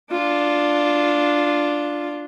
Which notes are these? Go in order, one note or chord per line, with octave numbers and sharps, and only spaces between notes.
D4 F4